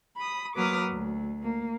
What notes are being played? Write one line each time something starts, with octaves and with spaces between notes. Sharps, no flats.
B5 D#6
F#3 A#3 B4 D6 D#6 F6
D2
A#3